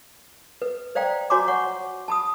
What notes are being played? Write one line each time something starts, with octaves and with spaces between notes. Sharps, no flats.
B4
C5 D5 F5 G5 A#5
F#4 C#5 G#5 A#5 C6 D6
C#5 F#5 C#6
A5 B5 D#6